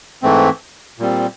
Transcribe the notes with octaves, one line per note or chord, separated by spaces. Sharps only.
G#2 E3 A3 C4
A#2 G3 C4